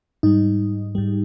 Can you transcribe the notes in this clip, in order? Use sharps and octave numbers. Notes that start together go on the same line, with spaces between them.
G#2 G3 D#4
G#2 G3